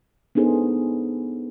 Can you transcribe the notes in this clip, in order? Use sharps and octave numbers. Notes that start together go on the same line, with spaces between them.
B3 D4 D#4 G#4 A4 C5